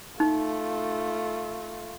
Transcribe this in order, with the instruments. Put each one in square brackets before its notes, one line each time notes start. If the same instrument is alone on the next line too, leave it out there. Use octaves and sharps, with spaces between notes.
[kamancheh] A3 F4 [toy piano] D#4